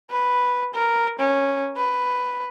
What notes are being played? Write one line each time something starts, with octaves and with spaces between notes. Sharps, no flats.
B4
A#4
C#4
B4